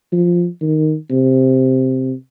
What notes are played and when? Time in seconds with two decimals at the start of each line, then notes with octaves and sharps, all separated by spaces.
0.12 F3
0.61 D#3
1.10 C3